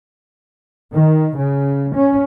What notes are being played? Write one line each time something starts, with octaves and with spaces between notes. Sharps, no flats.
D#3
C#3
C#4